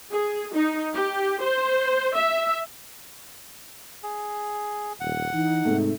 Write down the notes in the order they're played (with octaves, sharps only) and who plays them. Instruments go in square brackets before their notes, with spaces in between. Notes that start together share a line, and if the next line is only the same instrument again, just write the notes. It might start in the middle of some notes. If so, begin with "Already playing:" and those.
[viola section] G#4
D#4
G4
C5
E5
[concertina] G#4
[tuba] D#1 [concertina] F#5
[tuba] E3 [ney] D#4
[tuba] G#2 [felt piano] C3 A3